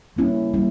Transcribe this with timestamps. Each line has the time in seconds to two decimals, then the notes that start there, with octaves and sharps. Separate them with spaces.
0.16 G3 A#3 C#4 E4
0.54 G3 A#3 C#4 E4